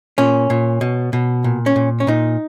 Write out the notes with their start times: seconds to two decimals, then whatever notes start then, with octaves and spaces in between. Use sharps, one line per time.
0.18 A#2 C#4
0.50 A#2
0.81 B2
1.13 B2
1.44 A#2
1.66 C#4
1.76 A#2
2.00 C#4
2.07 A#2 D#4